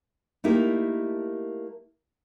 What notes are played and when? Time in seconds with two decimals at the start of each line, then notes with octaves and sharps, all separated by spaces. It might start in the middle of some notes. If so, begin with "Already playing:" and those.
0.44 A3 A#3 D#4 E4 G4 A#4